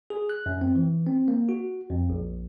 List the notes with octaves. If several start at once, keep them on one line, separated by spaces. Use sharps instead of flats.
G#4
F#6
F#2
C4
E3
C4
A#3
F#4
F2
A#1